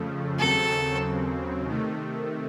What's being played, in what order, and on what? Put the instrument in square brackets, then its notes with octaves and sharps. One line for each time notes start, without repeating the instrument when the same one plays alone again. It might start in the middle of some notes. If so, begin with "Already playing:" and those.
Already playing: [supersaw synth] F2 C#3 F3 A3
[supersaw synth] D#2 C#3 F#3 C4 [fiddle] A4
[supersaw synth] C3 D#3 A3